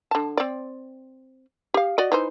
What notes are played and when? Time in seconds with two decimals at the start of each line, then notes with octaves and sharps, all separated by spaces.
0.11 D3 A5
0.37 C4 D5
1.74 G4 F5
1.98 F#4 D5 D#5
2.12 E3 D#4 C5